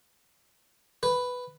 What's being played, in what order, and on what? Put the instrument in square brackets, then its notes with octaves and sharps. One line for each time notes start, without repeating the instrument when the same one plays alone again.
[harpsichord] B4